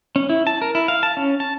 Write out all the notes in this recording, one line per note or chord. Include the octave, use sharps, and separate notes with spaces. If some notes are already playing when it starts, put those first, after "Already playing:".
C#4
E4
A5
A#4
E4
F5
A5
C#4
A5